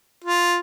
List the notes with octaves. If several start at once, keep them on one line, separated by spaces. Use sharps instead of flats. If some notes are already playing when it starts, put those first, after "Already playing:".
F4